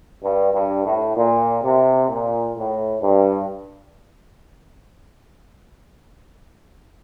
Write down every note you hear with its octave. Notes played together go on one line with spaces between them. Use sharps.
G2
G2
A2
A#2
C3
A#2
A2
G2